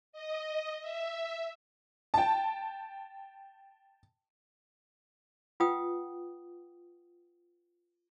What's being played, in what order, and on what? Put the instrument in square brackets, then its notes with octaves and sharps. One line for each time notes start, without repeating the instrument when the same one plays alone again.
[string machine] D#5
E5
[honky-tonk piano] G5 A5
[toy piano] F4 B4 F#5 G5 D#6